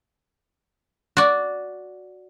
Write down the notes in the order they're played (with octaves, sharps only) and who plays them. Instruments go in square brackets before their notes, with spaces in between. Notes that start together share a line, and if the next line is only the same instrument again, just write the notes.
[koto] F#4 D5